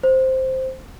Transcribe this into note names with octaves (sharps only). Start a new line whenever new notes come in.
C5